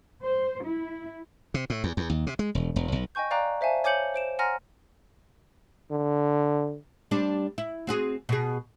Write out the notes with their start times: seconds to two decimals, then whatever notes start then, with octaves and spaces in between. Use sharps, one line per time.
0.22 C5
0.63 E4
1.54 C3
1.70 A2
1.84 E2
1.97 E2
2.09 D#2
2.27 C3
2.39 G#3
2.55 E1
2.76 E1
2.92 B1
3.15 D#5 G5 G#5 C#6 G6
3.31 D5 F5 G5 A#5 D6 F#6
3.61 C5 E5 F5 G#5 A5
3.84 C#5 G#5 D6 G6 C#7 F#7
4.14 C5 D7 E7
4.39 F#5 G#5 A#5 C6 F6 A#6
5.91 D3
7.11 G3 C4 D4
7.58 E4
7.87 C4 F#4 G#4
8.29 B2 G#4